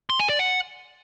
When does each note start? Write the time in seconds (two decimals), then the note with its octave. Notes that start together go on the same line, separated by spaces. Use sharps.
0.10 C6
0.19 G#5
0.29 D5
0.39 F#5